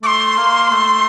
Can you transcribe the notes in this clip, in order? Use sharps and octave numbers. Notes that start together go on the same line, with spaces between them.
A3 C6 D6
A#3
A3